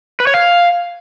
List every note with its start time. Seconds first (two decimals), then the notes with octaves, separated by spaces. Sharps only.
0.20 B4
0.27 C#5
0.34 F5